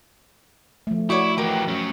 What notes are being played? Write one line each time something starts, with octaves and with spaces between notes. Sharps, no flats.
F3 A3
E4 F#4 C#5 D5 C#6
E3 G4 A#4
F#3 C#4